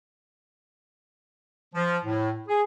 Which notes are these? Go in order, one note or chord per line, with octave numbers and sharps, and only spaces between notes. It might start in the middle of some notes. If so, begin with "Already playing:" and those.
F3
A2
G#4